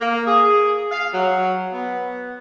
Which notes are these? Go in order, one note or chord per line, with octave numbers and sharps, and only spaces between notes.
A#3
G#4
F5
F#3
B3